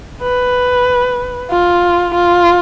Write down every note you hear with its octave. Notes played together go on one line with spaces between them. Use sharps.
B4
F4
F4